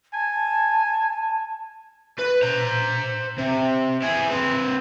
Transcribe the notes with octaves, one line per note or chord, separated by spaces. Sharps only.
G#5 A5
B4
C5 A#5
C3
E4 G#4
C4 B4